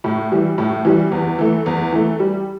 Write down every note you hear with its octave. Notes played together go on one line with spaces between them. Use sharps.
A2
E3 G3
A2
E3 G3
E2
E3 A3
E2
E3 A3
G3